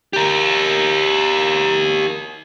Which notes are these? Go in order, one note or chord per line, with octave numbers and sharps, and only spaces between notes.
G4 A#4